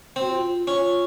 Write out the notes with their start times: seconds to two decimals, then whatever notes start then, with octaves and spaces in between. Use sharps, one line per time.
0.16 C4 F#4
0.29 F4
0.67 C#4 F4